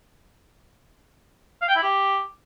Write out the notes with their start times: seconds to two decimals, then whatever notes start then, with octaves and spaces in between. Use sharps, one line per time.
1.61 F5
1.68 G5
1.75 E4
1.82 G4